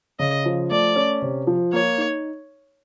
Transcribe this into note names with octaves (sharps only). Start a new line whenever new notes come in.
C#3 D#5
F3
A3 D5
C#4
C3
F3
A#3 C#5
D#4